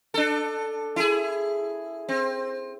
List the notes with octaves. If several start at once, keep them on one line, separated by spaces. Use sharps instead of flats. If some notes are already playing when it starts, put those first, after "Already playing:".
D4 A4
E4 G#4
C4